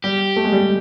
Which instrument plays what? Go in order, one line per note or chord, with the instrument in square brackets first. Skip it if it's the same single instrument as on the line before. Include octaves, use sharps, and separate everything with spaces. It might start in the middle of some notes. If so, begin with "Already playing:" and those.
[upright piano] G3 [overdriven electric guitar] G4
[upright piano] A3
G#3
G3
G#3